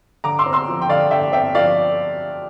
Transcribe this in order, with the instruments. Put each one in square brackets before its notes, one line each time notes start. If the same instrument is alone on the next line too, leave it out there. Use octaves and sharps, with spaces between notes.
[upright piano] D3 A#5 D6
C6 E6
C4
C6 E6
F3
G5
D3 D5 F5
D3 E5 G5
C4 E5 G5
F3 D5 F5